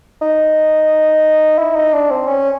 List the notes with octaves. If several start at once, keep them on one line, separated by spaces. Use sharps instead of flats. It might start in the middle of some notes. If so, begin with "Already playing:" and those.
D#4
E4
D#4
D4
C4
C#4